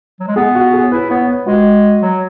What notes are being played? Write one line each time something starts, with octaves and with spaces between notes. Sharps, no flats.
F#3
G#3
B3 G#4
F#4
G#4
C#5
E4 B4
B3 C#5
B4
G#3 F#4
F#3